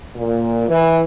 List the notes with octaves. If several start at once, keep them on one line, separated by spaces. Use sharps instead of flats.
A#2
E3